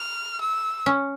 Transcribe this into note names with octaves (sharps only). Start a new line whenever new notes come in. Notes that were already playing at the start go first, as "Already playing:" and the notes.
Already playing: F6
E6
C#4